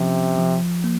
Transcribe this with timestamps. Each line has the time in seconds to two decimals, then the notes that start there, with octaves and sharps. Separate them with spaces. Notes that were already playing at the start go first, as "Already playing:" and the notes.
Already playing: C3 F3 C#4
0.38 F3
0.84 A#3